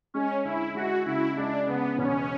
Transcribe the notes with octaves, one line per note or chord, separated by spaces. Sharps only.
G#3 C#4
D2 E4
G#3 F#4
C#3 E4
G#3 D4
C#3 B3
E1 C#4